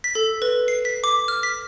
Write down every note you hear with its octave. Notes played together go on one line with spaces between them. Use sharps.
B6
A4
B4
C7
B6
D6
F6
B6